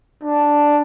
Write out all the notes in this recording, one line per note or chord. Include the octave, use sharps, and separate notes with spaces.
D4